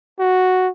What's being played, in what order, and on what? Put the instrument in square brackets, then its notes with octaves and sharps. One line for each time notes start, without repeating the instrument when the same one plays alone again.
[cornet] F#4